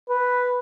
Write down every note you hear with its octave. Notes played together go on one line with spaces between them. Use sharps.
B4